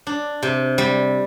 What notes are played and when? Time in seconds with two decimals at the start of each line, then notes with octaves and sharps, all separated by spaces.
0.07 D4
0.43 C3
0.78 G3